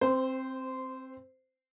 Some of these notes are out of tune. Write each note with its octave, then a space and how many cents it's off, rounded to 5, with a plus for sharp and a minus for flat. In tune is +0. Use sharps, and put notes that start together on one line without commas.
C4 +10 C5 -15